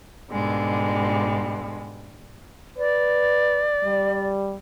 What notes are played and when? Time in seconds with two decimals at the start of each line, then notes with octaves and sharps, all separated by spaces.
0.32 G#2 B2 D3 G3 G#3
2.78 B4 D5
3.84 G3